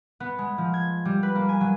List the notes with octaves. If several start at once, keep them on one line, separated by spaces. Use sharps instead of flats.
B3
G#3
F3
G#6
G3
B4
A#3
G#5
F#3